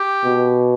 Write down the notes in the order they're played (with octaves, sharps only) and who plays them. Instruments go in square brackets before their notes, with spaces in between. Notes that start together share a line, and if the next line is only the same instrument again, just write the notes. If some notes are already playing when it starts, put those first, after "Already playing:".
Already playing: [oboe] G4
[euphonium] B2